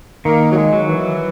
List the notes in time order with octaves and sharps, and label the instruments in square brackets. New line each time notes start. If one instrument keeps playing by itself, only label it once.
[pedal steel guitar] D#3 [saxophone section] A#3
[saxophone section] F#3
G#3
[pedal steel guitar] F#3
[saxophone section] E3